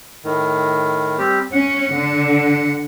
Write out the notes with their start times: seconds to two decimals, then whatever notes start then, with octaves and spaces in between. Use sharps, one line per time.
0.24 A2 D#3
1.18 G3 C4 G4
1.52 C#4 F#5
1.92 D3